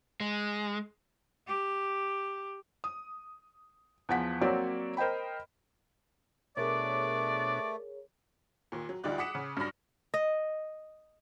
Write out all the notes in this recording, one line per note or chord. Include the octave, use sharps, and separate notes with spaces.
G#3
G4
D#6
E2 F3 F#5 B6
F#3 A#3 C4 F#4 C#5 D5
A#4 C5 D#5 G5 B5
B2 A3 D4 G#4 A#4 C#5 D5
D#2 A#2
F#3
D2 G3 D#4 F4 D5 F#6
F#5 D6 D#6 B6 C#7 E7
C#3
G2 F#3 D4 B5 A#6
D#5